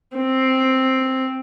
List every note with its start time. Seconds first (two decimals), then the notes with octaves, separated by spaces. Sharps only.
0.17 C4